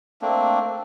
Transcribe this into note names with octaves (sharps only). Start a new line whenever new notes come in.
A3 A#3 C4 D4